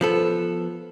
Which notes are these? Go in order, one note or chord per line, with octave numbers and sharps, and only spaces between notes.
F3 B3 A4